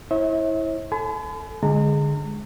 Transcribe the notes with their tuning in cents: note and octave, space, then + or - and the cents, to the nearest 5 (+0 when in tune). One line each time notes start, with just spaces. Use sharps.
E4 -15 C#5 -40 E5 -40
A4 +0 G#5 +40 B5 +45
D3 +0 G#3 +0 A#5 -40